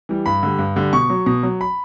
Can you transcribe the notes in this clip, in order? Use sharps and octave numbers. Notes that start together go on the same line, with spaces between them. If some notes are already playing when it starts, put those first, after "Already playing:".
E3 G3
G2 B5
D3 G3
G2
D3 G3
B2 C#6
F#3
B2
F#3
B5